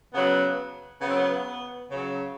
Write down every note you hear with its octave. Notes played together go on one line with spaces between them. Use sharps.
C#3 F#3 B3
C#3 F#3 B3 C4
B3
C#3 F#3